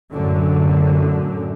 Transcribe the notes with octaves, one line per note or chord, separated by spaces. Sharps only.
F#2 A2 D3